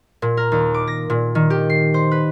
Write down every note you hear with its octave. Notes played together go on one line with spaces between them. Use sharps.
A#2
A#4
D#2
D6
A#6
A#2
D#3
G4
C7
C5
B4